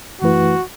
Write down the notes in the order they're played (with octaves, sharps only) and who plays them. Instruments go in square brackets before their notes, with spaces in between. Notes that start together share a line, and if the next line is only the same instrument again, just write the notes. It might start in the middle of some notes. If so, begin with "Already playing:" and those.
[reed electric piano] F#2 E3 A3 E4 B4 [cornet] F#4